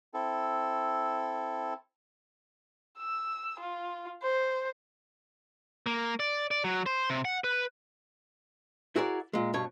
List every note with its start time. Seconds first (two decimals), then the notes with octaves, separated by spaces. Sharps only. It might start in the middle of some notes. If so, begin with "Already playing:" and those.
0.14 C4 E4 A4
2.98 E6
3.60 F4
4.22 C5
5.86 A#3
6.20 D5
6.51 D5
6.64 F#3
6.86 C5
7.10 C3
7.25 F#5
7.44 B4
8.96 E4 F#4 G#4 A#4 C#5 D5
9.33 A#2 G#3
9.54 G2 B2 C#5